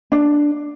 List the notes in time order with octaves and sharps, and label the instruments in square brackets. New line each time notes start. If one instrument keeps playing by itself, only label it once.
[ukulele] D4